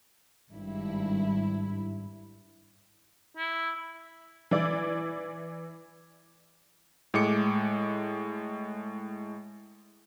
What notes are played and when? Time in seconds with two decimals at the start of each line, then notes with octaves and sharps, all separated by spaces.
0.51 G#1 G2 E4
3.37 E4
4.51 E3 E4 D5
7.14 A2 G#3 D6 C#7